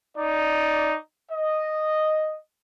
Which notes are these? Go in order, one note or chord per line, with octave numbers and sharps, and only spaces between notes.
D#4 D5
D#5